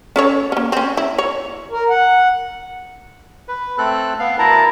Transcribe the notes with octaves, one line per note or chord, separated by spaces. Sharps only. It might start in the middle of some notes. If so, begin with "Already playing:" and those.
C#4 A4 C#5
A#3 C#4
C4 C#4
E4
C#5
A#4
F#5
B4
A3 C4 A4 F#6
B3 F5
D2 E4 A#4 A5 A#5